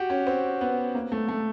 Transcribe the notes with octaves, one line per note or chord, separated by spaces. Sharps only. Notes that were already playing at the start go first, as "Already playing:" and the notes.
Already playing: F#4 G4
C#4
C4
B3
A#3
A3
A3